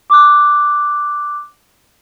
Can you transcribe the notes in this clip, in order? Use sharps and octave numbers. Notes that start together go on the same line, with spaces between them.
D6 F#6